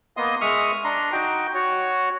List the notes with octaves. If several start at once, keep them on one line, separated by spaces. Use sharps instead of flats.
A#3 B3 D#5 C6 D#6
G#3 E5 C#6 D#6 F6
D4 A#5 C6
D#4 F#4 G5
F#4 C#5